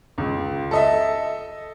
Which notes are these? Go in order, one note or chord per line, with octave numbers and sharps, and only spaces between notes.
C#2
A4 D#5 E5